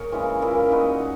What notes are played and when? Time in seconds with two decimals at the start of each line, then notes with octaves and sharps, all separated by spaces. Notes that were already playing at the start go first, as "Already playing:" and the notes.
Already playing: A#3 G#4 A#4 C#5
0.12 C#3 E3 G#3 C#4
0.42 A#2 A#3 E4
0.71 G#3 D#4 F#4 B4